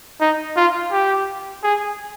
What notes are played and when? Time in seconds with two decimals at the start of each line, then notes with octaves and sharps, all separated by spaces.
0.21 D#4
0.56 F4
0.92 G4
1.63 G#4